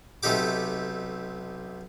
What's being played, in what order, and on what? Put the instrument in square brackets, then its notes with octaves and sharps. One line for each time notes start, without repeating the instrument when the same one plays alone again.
[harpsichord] B1 C3 A3 D#4 G4 D6